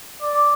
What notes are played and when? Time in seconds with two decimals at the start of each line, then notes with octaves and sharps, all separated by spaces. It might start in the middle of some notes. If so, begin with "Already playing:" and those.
0.21 D5